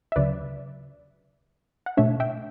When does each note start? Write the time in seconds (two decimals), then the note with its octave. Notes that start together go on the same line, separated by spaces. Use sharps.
0.12 E5
0.16 D2 C#3 F#3 B4 D5
1.86 F#5
1.97 B2 A3 D4 C#5 E5
2.20 E5 G5